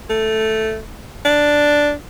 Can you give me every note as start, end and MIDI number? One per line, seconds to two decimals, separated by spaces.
0.10 0.79 57
1.25 1.93 62